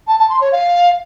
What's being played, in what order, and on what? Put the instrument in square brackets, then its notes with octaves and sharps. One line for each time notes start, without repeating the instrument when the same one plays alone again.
[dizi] A5
A5
C6
C#5
F5